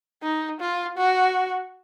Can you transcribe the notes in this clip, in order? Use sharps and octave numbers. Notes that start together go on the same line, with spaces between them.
D#4
F4
F#4